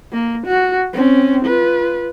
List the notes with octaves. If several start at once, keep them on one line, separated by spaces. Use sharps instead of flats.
A#3
F#4
C4 C#4
F4 B4